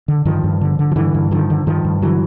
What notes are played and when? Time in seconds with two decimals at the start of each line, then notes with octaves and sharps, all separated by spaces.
0.08 D3
0.25 G2 D#3 F3
0.44 G2
0.61 D3
0.79 D3
0.92 F3
0.96 G2 D3 E3
1.15 G2
1.31 D3 D#3 F3
1.50 D3
1.67 G2 D#3 F3
1.85 G2
2.02 D3 E3 F#3